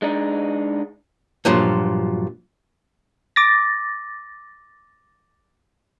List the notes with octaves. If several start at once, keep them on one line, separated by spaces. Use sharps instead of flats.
G#3 D4 D#4
G2 A#2 F3 F#3
D6 A6 A#6